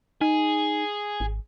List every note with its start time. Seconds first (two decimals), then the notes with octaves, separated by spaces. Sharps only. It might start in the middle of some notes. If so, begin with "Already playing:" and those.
0.21 D#4 G#4
1.20 G#1